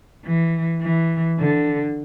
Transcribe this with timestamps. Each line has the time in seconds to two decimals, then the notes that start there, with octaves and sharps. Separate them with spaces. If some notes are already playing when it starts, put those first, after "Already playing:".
0.24 E3
0.81 E3
1.38 D3